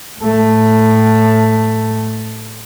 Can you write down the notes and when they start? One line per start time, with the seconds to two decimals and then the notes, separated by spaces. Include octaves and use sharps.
0.19 A2 A3